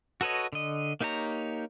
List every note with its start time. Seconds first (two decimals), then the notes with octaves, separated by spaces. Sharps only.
0.21 F#4 A4 B4 C#5 D#5
0.53 D3 D#5
1.01 A#3 D#4 G4 C#5 A#5